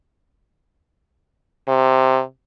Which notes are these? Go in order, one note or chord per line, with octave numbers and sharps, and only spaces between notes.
C3